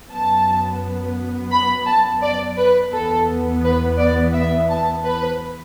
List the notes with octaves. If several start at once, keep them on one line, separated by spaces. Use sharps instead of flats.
F#2 F#3 B3 A5
B5
A5
D5
B4
E2 E3 B3 A4
B4
D5
E5
A5
B4